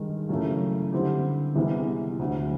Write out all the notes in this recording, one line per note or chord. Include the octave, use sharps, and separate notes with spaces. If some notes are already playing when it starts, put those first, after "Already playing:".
Already playing: G2 D#3 G#3
F#2 C#3 E3 A3
D3 G3 C4 E4 G4
C2 C3 E3 G#3 B3
D2 D3 F#3